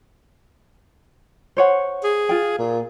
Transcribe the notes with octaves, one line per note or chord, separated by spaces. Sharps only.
C5 C#5 F#5
G#4
F4 G5
A#2